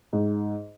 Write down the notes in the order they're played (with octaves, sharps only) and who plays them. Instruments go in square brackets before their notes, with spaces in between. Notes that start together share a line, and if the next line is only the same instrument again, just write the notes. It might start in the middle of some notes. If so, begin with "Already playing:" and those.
[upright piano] G#2